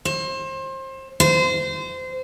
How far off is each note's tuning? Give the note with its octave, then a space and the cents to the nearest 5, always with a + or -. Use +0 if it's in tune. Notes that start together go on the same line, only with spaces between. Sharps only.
C5 +30
C5 -25